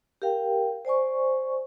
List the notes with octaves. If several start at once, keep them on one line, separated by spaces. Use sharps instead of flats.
G4 A#4 F5 G5
C5 D5 G#5 C#6